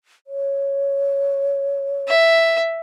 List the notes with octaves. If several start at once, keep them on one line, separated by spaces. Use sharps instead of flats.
C#5
E5